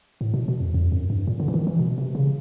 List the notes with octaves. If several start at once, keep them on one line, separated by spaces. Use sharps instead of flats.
A2
B2
B2
F2
F2
F#2
G2
A#2
D3
E3
D#3
E3
B2
C3
C#3